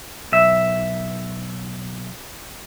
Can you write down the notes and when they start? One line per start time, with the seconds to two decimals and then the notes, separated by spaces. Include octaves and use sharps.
0.32 B1 E5